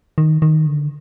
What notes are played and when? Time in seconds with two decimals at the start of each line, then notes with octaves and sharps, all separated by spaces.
0.18 D#3
0.42 D#3
0.66 D3